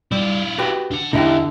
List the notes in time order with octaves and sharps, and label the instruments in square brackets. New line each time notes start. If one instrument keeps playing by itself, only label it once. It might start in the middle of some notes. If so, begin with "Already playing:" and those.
[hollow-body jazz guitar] G3 [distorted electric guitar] E4 F4
[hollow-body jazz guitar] F#4 G4 B4
[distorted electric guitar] D4 F#5
[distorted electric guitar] E2 [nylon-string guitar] D3 [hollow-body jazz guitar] D#4 E4 G4